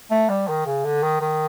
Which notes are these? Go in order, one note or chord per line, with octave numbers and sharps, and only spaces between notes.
A3
G3
D#3
C#3
D3
D#3
D#3